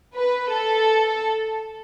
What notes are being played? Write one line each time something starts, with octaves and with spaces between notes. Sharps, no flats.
B4
A4